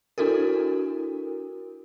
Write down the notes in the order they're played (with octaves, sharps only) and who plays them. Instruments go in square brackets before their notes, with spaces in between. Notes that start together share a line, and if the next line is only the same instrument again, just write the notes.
[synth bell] D4 E4 F#4 A4 A#4